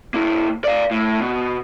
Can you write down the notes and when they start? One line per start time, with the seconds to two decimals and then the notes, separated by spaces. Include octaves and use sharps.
0.14 A#3 E4
0.64 D5 F5
0.91 A2
1.20 B2